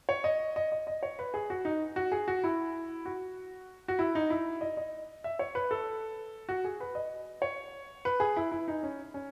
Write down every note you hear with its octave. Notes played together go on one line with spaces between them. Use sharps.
C#5
D#5
D#5
D#5
D#5
C#5
B4
G#4
F#4
D#4
F#4
G#4
F#4
E4
F#4
F#4
E4
D#4
E4
D#5
D#5
E5
C#5
B4
A4
F#4
G#4
B4
D#5
C#5
B4
G#4
E4
E4
D#4
C#4
C#4